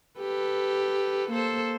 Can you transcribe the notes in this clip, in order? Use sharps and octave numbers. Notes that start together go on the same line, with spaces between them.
G4 A4 B4
A#3 A4 C5